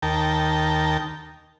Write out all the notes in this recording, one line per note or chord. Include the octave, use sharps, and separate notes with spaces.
D#2 A#4 G5 A5